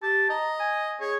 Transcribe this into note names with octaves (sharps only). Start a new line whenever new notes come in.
G4 A5
D#5 A#5
G#5
G#4 C#5